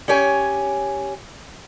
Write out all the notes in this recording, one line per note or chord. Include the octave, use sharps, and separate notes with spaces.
C#4 G4 C#5 G#5